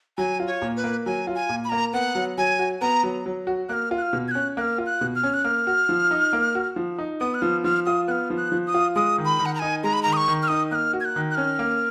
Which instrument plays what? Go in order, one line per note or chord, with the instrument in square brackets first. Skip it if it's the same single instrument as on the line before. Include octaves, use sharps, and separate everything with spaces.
[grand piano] F#3 [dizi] G#5
[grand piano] F4
[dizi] C#5
[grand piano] A#2
[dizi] B4
[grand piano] A#3
[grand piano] F#3 [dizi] G#5
[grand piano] F4
[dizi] G#5
[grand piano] A#2
[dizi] B5
[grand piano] A#3 [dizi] A#5
[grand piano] B3 [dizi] F#5
[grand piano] F#3
[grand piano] F#3 [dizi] G#5
[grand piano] F#4
[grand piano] B3 [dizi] A#5
[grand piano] F#3
F#3
F#4
[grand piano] A#3 [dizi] F6 F#6
[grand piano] F4
[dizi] F#6
F6
[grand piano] B2
[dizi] G#6
[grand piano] C#4 [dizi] F#6
[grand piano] A#3 [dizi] F#6
[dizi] F6
[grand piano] F4
[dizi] F#6
[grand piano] B2
[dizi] F6
[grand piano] C#4
[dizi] F#6
[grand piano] A#3 [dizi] F6
[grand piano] F#4
F3
D#4
A#3
F#4
F3
D#4
[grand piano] B3 [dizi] D#6
[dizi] F#6
[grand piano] F3 [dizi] F6
[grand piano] F3 [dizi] F6
[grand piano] F4 [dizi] D#6
[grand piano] B3 [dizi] F6 F#6
[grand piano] F3
[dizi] F#6
[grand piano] F3
[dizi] D#6
[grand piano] F4
[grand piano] G#3 [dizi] D#6
[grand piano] D#3
[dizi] B5
[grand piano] D#3
[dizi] F#5
A#5
[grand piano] D#4 [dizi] G#5
[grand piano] G#3 [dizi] A#5
[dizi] B5
A#5
[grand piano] D#3
[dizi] D#6
C#6
[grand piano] D#3
[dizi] F6
[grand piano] D#4 [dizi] D#6
[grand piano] A#3 [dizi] F#6
[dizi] F6
[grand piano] F#4
[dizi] G#6
F#6
[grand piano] D#3
[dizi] F#6
[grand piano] C#4 [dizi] F6
[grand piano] A#3